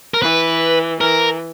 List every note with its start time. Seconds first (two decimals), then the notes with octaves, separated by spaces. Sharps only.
0.14 A#4
0.22 E3 B4
1.00 E3 A#4